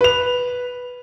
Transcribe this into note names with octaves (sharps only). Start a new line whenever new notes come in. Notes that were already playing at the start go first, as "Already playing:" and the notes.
B4 F7